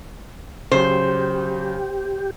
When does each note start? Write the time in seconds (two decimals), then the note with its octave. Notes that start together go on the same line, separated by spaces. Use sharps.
0.72 C#3 F#3 G4 C5